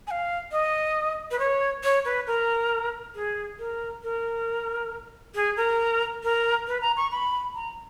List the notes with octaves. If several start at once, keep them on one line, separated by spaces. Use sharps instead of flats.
G#5
F5
D#5
B4
C#5
C#5
B4
A#4
G#4
A#4
A#4
G#4
A#4
A#4
B4
A#5
C#6
B5
A#5